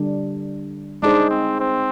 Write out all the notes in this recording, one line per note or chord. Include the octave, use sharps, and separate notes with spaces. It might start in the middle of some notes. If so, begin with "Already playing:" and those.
Already playing: D3 G3 D4
G#3 D4 D#4 G#4 C5
C4
C4